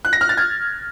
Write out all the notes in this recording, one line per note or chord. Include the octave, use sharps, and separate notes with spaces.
F#6
A#6
F6
A6
G#6